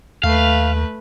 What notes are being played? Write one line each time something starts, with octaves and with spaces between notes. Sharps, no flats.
D#2 A3 B4 F5